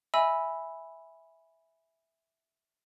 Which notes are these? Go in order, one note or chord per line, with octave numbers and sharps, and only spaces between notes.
D#5 E5 G#5 B5 E6